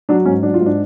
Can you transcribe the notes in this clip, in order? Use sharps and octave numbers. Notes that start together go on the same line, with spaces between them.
F#3 D4
G#2 C#4
F#3 D4
F4
G#2
D4